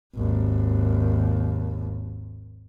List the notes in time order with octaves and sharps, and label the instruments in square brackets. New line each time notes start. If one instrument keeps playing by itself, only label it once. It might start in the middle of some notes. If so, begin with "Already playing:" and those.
[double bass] G#1 D#2